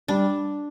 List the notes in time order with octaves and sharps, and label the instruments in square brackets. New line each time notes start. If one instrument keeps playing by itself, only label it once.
[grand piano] G3 [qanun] D4